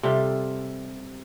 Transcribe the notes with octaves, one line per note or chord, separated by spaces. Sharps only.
C3 G3 F4 A4